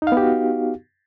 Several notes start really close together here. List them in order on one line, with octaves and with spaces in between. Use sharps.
D#4 F5 B3 G4 F#4